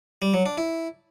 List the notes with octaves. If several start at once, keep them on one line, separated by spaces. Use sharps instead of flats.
G3
F#3
D4
E4